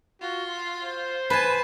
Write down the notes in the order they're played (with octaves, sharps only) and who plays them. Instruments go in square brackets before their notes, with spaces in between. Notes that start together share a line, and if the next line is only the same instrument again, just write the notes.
[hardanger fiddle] F4 [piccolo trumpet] F#4
[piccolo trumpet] C6
C5
[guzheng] B4 G#5 [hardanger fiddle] A5